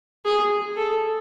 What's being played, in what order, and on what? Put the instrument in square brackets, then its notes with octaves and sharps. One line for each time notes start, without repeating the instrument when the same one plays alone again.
[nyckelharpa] G#4
A4